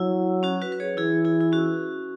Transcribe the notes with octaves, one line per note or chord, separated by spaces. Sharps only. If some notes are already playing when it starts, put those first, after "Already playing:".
Already playing: F#3 E4
C#4 F#4
F#4 B4
B4
G#4 C#5
E3 E4 G#4
E4 G#4
E4
C#4 F#4